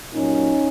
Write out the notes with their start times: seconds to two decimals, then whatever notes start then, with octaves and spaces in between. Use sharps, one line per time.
0.13 A#2 F#3 C#4 D#4